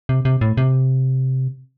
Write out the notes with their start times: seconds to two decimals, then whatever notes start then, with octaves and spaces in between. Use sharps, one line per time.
0.09 C3
0.25 C3
0.41 A2
0.57 C3